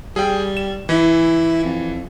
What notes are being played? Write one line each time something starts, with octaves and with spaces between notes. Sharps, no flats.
G3 G#4 G5
E7
E3 E4
F2